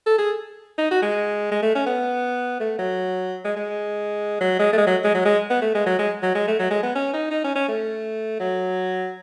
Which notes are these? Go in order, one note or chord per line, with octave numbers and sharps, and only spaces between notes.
A4
G#4
D#4
F#4
G#3
G#3
A3
C#4
B3
A3
F#3
G#3
G#3
F#3
G#3
A3
G#3
F#3
G#3
F#3
G#3
B3
A3
G#3
F#3
G#3
F#3
G#3
A3
F#3
G#3
B3
C#4
D#4
D#4
C#4
C#4
A3
F#3